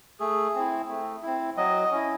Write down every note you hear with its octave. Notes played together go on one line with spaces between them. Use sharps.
A3 G#4
C4 E4
A3
C4 E4
F#3 D#5
C#4 E4